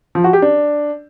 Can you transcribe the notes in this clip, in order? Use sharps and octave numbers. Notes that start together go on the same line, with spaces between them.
F3
F#4
G4
D4